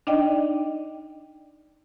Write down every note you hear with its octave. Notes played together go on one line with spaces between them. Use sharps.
D4 D#4 D5 D#5 G5